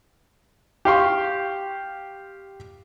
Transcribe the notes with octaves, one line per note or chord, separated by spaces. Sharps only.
G4 F5 C6 C#6